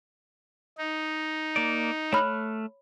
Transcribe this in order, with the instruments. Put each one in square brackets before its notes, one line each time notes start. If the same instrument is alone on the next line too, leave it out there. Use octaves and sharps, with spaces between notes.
[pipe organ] D#4
[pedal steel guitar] A#3 D5
[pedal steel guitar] A3 F6 F#6 [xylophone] C#5 B5